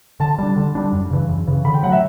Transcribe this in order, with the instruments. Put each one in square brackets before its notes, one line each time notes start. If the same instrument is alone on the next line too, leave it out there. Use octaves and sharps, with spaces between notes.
[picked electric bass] D3 [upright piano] A5
[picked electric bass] G3 D4
D3
G3 D4
F#2
C#3 E3
F#2
C#3 E3
[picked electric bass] D3 [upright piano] B5
[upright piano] G5
[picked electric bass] F#3 A3 [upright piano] F#5
[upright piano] E5